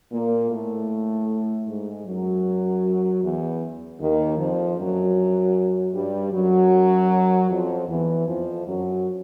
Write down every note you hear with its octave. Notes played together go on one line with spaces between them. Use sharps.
A#2 A#3
A2 A3
G#2 G#3
F#2 F#3
E2 E3
D#2 D#3
F2 F3
F#2 F#3
G2 G3
F#2 F#3
F2 F3
E2 E3
F2 F3
F#2 F#3